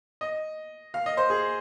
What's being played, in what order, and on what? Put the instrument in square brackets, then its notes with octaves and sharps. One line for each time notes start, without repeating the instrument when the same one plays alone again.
[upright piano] D#5
F5
D#5
C5
G#4